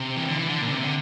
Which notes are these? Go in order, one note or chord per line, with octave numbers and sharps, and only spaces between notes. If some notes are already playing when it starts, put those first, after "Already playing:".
Already playing: C3
E3
D3
E3
D3
A#2
D3
C3
D3